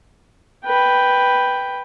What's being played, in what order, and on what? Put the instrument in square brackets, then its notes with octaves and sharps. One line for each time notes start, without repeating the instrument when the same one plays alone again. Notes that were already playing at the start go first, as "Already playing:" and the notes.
[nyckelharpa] B4 G5